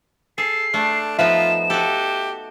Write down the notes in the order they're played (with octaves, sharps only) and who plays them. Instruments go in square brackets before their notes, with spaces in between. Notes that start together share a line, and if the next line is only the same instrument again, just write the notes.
[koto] G#4 [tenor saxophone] A4 [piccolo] C7
[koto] A3 [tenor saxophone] D4
[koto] F3 B3 D#4 [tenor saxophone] F4 [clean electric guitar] E5 [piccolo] E7
[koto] F#4 A4 [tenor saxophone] G4